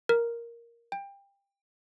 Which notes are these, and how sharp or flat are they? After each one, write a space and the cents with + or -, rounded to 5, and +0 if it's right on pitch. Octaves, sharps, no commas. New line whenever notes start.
A#4 +5
G5 +25